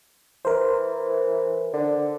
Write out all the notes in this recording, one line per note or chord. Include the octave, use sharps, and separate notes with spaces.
E3 A#4 C5
D3